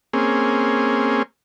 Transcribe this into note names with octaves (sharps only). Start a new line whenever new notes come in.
A#3 C4 C#4 G#4